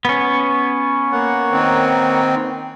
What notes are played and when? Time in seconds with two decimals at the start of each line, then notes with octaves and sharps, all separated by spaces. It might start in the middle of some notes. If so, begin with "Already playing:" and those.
0.05 B3 C#4
1.12 A#3 C#5 F#5
1.52 D#3 C4